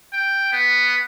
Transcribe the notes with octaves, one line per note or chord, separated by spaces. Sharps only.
G5
B3